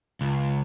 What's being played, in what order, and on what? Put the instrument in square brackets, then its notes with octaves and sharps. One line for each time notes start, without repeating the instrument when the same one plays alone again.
[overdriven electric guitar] C#2